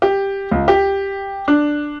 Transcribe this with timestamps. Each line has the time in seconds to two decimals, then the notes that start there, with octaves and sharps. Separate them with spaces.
0.02 G4
0.51 C#2
0.68 G4
1.48 D4